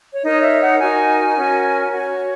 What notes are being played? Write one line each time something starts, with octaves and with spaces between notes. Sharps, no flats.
C#5
D#4 A#4 C#5 D#5
E5
F#5
D#4 F#4 A#4 G#5
C#4 F#4 A#4
F#4 C#5